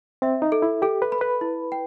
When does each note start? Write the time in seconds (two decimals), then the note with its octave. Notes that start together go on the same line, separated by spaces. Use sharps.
0.22 C4 E5
0.42 D#4
0.52 A4
0.62 E4
0.82 G4 A4
1.02 B4
1.12 B5
1.21 B4
1.41 E4
1.72 G5